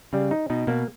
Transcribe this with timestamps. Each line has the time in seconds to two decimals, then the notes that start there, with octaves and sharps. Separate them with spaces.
0.13 C#3 G3
0.31 D#4
0.50 B2 D#4
0.67 B2 A#3